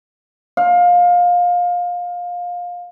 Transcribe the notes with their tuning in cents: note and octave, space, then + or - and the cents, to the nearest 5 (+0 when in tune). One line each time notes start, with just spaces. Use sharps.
F5 +20